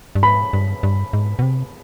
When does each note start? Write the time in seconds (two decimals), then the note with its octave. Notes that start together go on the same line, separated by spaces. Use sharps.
0.15 G2
0.23 G#2 B5
0.53 G2
0.83 G2
1.13 G#2
1.39 B2
1.42 C3